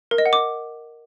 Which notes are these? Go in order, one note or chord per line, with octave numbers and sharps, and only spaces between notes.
A#4
D#5
F#5
D6